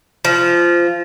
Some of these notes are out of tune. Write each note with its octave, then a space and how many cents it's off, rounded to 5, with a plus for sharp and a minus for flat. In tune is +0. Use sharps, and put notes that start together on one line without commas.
F3 -15